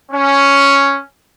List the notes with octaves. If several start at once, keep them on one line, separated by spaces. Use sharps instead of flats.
C#4